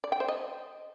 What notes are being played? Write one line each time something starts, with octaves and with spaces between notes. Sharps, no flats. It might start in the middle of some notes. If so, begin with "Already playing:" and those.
D5
G5
C5
D#5